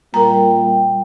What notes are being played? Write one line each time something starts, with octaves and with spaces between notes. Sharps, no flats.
A#2 G3 A#4 G5 A#5